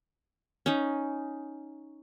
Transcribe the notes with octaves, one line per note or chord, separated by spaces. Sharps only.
C#4 D#4